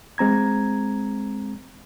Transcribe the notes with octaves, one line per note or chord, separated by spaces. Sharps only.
G#3 C4 A#5 G#6